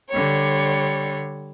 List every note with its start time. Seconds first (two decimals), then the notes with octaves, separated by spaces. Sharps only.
0.10 D3 G3 C#5